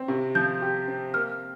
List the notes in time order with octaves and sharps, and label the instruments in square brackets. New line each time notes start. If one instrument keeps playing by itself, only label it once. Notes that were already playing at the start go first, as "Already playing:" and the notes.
Already playing: [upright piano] C4
C3
[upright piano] F3 [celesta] G6
[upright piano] G4
C4
[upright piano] A#3 [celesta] F6